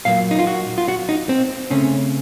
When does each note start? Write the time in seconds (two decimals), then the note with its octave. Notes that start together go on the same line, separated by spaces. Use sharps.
0.05 A#2 F#3 A#3 F5
0.31 D#4
0.39 F4
0.47 F#4
0.78 F4
0.88 F#4
1.09 D#4
1.29 C4
1.70 C#3 A3 C4 C#4